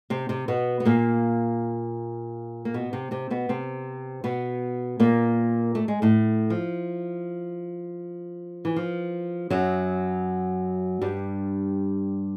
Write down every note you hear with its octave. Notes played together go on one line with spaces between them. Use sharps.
C3 C4
C3 C4
B2 B3
B3
A#2 A#3
A#3
B2 B3
C3 C4
C3 C4
B2 B3
C3 C4
B2 B3
A#2 A#3
A3
G#3
A2 A3
F3
E3
F3
F#2 F#3
G2 G3